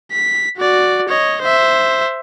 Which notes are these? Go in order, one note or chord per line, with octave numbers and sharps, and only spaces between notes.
B6
F#4 D5
C#5 D#5
C5 E5